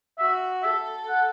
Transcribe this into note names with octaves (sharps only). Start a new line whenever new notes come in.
F#4 E5
A4 E5
F#5